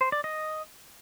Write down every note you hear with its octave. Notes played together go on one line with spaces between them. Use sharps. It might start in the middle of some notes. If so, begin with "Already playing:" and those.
C5
D5
D#5